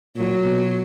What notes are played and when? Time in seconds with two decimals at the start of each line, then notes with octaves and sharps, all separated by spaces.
0.17 A#2 F#3
0.45 B2